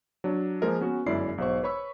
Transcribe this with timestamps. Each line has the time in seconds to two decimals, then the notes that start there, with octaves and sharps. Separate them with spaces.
0.24 F#3 D4
0.62 F3 G#3 A#3 G#4 A#4 D#5
0.81 B3 C#4 F#4
1.06 G1 F#2 G#3 E4 D5 C7
1.38 B1 G#2 C5 C#6
1.63 B4 C#5 B5 C#6 E6